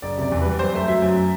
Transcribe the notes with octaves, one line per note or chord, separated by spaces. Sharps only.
F#1 D5
C3 D5
E2
G3 B4
F#2 C5
A3
F#3 E5
F#2